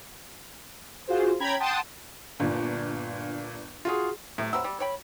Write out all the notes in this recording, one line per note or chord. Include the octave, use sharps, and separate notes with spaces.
F4 F#4 G#4 C5
C#4 G5 A#5 B5 G#6
F#5 G5 A5 C6 D#6
G1 A#2 D4
F4 F#4 G#4
A2 C3
F#3 B3 C4 E6
G3
C#5 G5 B5